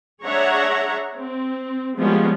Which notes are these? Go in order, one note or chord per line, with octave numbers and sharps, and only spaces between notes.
D4 G#4 C#5 E5 F#5 A#5
C4
F3 G3 G#3 A#3 B3 C#4